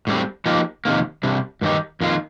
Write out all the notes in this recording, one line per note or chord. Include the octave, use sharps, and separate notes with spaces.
A2 G3 C4
F3 A#3 D#4 G4
F2 C3 D#3 A#3
C3 G3 D4
G2 D#3 A3 D#4 G4
F2 D#3 A#3 F4